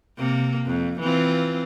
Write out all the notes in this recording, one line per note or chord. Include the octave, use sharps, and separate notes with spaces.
C3 A#3
F2
E3 C4 F4